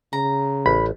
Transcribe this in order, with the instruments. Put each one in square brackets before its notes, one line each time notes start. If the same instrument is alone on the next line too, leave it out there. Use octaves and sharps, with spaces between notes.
[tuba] C#3 [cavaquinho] A#5
[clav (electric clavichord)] A1 [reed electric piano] B5